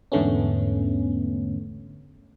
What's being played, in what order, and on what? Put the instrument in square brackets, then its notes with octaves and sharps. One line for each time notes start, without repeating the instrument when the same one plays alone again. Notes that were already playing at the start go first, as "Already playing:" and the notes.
[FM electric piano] E2 G#2 D3 A3 B3 C#4